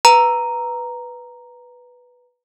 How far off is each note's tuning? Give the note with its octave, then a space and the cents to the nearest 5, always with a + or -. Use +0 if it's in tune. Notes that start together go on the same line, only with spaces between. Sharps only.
B4 +0 A#5 +0